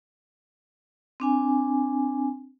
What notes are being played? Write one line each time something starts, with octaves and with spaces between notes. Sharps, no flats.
C4 D4 G#5